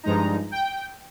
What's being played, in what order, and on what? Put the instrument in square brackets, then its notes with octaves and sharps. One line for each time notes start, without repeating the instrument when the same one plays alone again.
[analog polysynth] G2 F3 G#3 D#4 A#5
G5